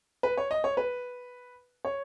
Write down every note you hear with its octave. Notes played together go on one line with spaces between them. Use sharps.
B4
C#5
D#5
C#5
B4
C#5